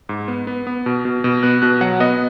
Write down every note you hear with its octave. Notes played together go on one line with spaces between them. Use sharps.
G#2
B3
B3
B3
B2
B2
B2
B3 F#6
B2 F#6
F#3 F#5
B3 D#5